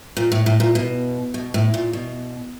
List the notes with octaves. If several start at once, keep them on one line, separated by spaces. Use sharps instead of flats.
A#2
A2
A2
A#2
B2
B2
A2
A#2
B2